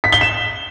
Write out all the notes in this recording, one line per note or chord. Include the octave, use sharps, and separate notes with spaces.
B6
G7
E7